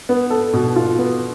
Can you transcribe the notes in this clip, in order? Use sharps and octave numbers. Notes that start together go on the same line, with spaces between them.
B3
A4
B2
F4
B3